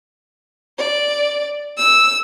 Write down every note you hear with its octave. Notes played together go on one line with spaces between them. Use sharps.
D5
E6